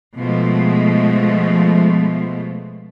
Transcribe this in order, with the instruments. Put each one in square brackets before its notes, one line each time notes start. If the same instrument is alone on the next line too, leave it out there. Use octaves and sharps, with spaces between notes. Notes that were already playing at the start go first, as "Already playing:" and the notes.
[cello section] B2 F3 G#3 A3